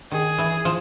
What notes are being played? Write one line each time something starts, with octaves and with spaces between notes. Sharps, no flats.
D#3 G#4
E3
F3